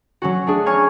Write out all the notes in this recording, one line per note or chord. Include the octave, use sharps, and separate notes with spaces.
F#3 C#4 F#4
A3 D4 G#4
C#5 G#5 A#5 C#6 F6 G#6